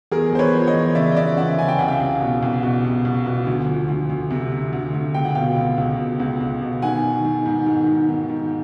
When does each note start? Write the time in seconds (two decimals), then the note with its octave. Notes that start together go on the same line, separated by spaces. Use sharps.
0.11 E2 G#4 A#4
0.33 E2 C5
0.39 B4 C#5
0.53 F3
0.67 C#5 D#5
0.74 E2
0.95 C#3 D5 E5
1.12 D#5
1.16 E2 D5 E5
1.37 C#3 E5 F#5
1.58 C#3 G#5
1.68 G5
1.79 C2 F#5
1.88 F5 G5
2.00 C2
2.21 B2
2.43 C2
2.63 B2
2.84 C2
3.05 C2
3.26 B2
3.47 D2
3.68 F3
3.89 D2
4.10 D2
4.31 C3
4.52 C3
4.73 D2
4.94 D2
5.14 C#2 G5
5.25 F#5
5.35 B2 F5 G5
5.57 C#2
5.78 C#2
5.99 B2
6.20 C#2
6.41 C#2
6.62 B2
6.82 D#3 F#5 G#5
7.04 D#3
7.25 D#3
7.46 G#2
7.66 D#3
7.87 G#2
8.08 D#3
8.30 G#2